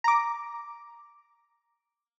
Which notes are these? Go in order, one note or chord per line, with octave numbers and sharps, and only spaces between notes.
A#5 D6